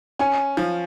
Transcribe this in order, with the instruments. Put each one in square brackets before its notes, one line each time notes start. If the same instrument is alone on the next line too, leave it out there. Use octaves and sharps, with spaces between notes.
[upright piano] C#4 [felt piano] G#5
[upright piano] F3